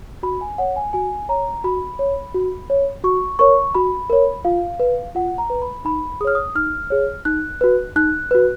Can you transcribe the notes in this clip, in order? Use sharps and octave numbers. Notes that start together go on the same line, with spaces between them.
F#4 B5
G#5
C#5 F#5
G#5
F#4 G#5
C#5 A#5
F#4 B5
C#5
F#4
C#5
F#4 C#6
A#4 C#5 C#6
F#4 B5
A#4 C#5
F4 F5
B4
F4 F#5
A#5
B4
B5
D#4 B5
G#4 C#5 D#6 F6
D#6
D#4 F6
G#4 C#5
D#4 F#6
F#4 B4
D#4 F#6
F#4 B4